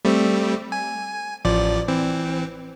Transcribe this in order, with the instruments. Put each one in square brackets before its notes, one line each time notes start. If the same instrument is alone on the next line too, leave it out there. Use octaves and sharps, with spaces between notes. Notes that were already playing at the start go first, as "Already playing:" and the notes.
[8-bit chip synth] G3 A3 C4
G#5
A1 F3 D5
E3 C4